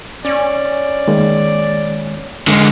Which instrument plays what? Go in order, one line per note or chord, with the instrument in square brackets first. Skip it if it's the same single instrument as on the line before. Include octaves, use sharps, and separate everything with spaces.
[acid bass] C#4 [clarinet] D5
[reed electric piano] D#3 G#3 A#3
[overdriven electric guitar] D3 G#3 [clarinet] A#4